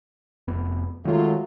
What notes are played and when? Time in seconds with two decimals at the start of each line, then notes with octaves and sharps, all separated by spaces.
0.48 F1 F2 B3
1.05 D#3 F#3 G#3 A3 F4